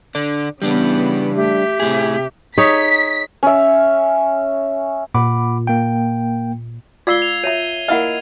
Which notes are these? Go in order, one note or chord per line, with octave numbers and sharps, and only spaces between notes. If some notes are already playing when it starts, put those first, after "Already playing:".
D3 D4
C#3 E3 G3 B3 D4
A3 G4 E5
A2 C3 G#4
D#4 G#4 C#5 B6
C#4 E5
A#2 F#5 B5 D6
A#3 G5
F4 D5 F5 E6 G#6 C7 G7
F7
C#5 E5 A#5 D#7 F7
A#3 E4 D#5 F5 F#5